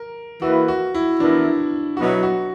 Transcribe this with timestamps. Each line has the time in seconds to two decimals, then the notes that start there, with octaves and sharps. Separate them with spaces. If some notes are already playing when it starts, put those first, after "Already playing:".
Already playing: A#4
0.42 E3 A#3 E4 F#4 B4
0.68 F#4
0.95 E4
1.19 E3 B3 D4 E4 A#4
1.97 B2 F#3 B3 E4 F#4 B4
2.23 F#4